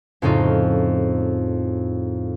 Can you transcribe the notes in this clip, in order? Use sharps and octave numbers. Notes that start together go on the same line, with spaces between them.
F2 A2 C#3 D#4 F4